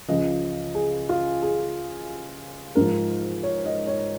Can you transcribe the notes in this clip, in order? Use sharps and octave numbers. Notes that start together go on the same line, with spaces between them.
C#2 C#3 F3 D#5
G#4
F4
G#4
G#2 F3 A#4
C#5
D#5
C#5